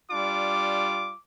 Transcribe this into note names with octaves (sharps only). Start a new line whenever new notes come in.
G3 D4 F4 D6